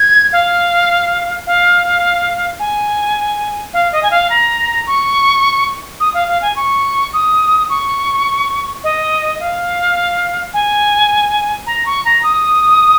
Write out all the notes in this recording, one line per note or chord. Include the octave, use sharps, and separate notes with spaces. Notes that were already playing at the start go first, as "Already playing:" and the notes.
Already playing: G#6
F5
F5
G#5
F5
D#5
G#5
F5
A#5
C#6
D#6
F5
F5
G#5
C#6
D#6
C#6
D#5
F5
G#5
A#5
C#6
A#5
D#6